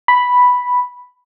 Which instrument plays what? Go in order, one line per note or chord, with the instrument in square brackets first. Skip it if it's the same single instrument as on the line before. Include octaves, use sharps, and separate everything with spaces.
[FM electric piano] B5